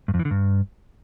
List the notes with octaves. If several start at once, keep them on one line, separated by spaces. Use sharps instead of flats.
G2
F2
E3
D3
G2